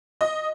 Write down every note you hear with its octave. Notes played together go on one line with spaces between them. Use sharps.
D#5